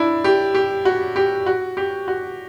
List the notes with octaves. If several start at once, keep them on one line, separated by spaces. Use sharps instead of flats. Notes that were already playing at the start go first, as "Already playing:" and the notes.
Already playing: D4 E4
G4
G4
F#4
G4
F#4
G4
F#4